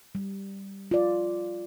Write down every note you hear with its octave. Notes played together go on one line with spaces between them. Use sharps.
G3
F4 D5